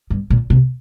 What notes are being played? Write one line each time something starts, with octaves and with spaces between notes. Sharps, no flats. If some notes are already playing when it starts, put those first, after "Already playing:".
G2
A#2
C3